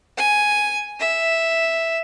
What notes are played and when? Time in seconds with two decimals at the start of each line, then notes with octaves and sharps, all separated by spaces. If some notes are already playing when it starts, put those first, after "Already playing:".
0.17 G#5
1.00 E5